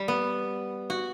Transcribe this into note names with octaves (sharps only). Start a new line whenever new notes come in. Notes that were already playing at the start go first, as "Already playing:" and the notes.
Already playing: G3
B3
F#4